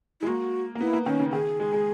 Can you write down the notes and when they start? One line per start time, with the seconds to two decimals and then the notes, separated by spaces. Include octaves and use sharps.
0.21 G#3 E4
0.27 A#3 F#4
0.75 A#3
0.79 B3 E4
0.93 A#3
1.06 D#3 C#4
1.20 C#3
1.32 D#3 G#4
1.60 G#3
1.73 G#3